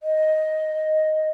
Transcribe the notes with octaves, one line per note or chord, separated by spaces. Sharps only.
D#5